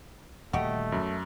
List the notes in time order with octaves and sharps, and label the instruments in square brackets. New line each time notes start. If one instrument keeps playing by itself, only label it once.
[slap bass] D#1 D3 [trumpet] A3 [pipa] F#4 G4 D#5
[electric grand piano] F#2